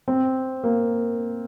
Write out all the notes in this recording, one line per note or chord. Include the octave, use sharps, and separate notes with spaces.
C4
A#3